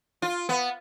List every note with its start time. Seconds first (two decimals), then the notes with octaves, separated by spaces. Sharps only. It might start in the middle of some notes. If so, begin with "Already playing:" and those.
0.22 F4
0.49 B3